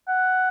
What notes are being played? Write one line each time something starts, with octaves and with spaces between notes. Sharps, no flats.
F#5